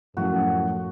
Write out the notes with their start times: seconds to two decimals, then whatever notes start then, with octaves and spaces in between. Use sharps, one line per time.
0.17 F#2 A2 F3 F#4